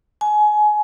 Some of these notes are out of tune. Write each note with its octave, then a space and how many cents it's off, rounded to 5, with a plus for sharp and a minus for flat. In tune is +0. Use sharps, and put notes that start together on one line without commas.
G#5 +25